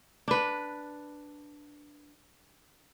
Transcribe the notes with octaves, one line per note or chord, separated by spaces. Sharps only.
D4 B4